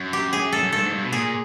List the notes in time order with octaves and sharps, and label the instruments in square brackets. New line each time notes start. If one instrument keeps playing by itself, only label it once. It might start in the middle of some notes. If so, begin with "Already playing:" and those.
Already playing: [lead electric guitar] F#2
[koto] G4
G#4
A4
[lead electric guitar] F#2
[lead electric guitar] G2 [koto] A4
[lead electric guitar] G#2
G2
B2
[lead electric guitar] A#2 [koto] G#4